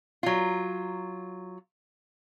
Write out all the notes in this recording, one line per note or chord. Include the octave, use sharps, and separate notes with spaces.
F#3 F4